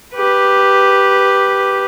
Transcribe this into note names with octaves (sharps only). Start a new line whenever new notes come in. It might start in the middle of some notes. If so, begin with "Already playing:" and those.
G4 B4